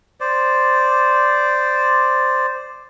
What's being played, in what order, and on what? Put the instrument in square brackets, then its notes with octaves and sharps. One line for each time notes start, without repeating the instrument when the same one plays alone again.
[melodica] C5 D5